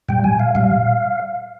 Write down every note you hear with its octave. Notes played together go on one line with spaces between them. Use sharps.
A#2 G3 G5
G#5
F5
A#2 G3 F5